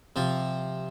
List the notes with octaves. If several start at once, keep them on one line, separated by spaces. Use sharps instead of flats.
C3 F3 F4